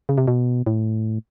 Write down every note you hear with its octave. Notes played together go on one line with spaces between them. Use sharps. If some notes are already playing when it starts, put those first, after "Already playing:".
C#3
C3
B2
A2